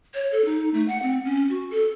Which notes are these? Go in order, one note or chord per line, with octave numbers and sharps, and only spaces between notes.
C#5
A4
D#4
A3
F#5
C4
C#4
F#4
A4